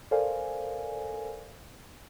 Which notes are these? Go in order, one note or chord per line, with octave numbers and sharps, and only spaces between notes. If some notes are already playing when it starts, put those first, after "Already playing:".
A4 A#4 C5 D5 F5 G#5